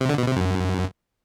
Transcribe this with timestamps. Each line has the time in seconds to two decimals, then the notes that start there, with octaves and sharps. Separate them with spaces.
0.01 C3
0.09 D3
0.18 B2
0.27 C3
0.36 F#2